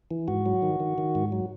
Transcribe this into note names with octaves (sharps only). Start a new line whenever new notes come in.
E3
G#2 F#4
F#3
D#3
D#3
D#3
G#2
F#3